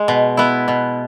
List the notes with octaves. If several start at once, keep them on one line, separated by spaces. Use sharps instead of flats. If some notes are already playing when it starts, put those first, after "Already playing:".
Already playing: G#3
B2
B3 E4
B2